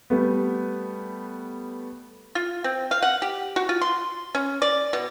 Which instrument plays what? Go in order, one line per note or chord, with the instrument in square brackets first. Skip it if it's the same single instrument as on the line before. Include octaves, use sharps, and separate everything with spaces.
[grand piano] G3 A3 B3
[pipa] F4
C4
F5
F#5
G4
F#4
F4
C6
C#4
D5
B2